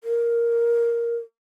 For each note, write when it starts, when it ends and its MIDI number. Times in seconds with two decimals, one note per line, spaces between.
0.04 1.16 70